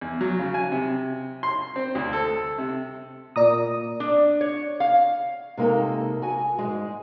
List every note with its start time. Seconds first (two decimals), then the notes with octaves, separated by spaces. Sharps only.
0.01 E2
0.21 F#3
0.39 C#3
0.54 G#5
0.72 C3
1.43 C6
1.76 C4
1.95 D2
2.13 A4
2.58 C3
3.36 A#2 D5 A#5 D#6
4.00 D4
4.41 C#5
4.80 F5
5.57 C3 G#3 A#3 D#4 A4
6.22 F#4 G#5
6.59 G#2 G#3